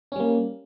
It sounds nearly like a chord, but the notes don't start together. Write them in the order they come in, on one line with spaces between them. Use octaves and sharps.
C#4 G3 A#3